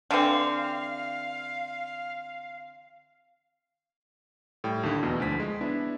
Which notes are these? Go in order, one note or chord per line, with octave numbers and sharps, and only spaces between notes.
D3 E3 C4 F5
A2 G3 G5
D#2 D3
E2 B2 D#5
D2 F3 A5 B6
G#3
B3 D4 E4